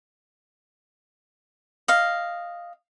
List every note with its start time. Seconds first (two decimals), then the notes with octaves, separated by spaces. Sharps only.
1.88 D#5 F5